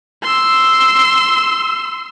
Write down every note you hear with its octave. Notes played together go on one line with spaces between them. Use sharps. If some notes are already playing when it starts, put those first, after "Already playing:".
C6 E6